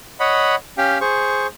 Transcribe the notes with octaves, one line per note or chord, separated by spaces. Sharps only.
C#5 D#5 F#5 B5
C#4 G4 F5 G5
G#4 C5 C#6